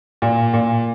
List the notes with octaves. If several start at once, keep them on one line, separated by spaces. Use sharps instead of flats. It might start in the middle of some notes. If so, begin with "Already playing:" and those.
A#2
A#2